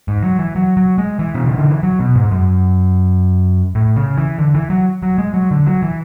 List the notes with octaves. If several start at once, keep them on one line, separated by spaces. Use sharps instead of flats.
G#2
F#3
E3
F#3
F#3
G#3
E3
B2
C#3
D3
E3
F#3
B2
G#2
F#2
A2
C#3
E3
D3
E3
F#3
F#3
G#3
F#3
D3
F#3
E3